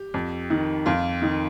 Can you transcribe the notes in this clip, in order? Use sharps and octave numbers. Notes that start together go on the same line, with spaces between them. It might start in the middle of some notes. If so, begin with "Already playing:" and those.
Already playing: G4
F2
D#3
F2 F4
D#3